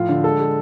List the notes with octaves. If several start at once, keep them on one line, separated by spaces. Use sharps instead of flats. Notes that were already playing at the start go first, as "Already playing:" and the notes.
Already playing: A2 F3 F4
D3
G#3 A4
G#3